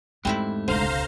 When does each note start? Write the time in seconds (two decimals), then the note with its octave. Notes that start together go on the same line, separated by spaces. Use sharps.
0.25 E2 G#2 G3 A3 C4 C#4 E4
0.68 E1 C#2 D3 C5 F5 A#5